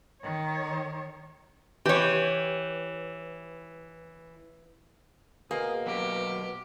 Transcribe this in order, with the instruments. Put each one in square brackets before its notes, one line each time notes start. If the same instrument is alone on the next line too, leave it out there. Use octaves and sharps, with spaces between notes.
[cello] D#3 C#5
[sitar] E3 [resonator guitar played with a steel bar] G4 C#5
[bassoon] B2 [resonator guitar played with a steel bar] A#3 [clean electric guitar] G#4
[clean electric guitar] F#3 B3 A#4 [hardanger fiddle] G4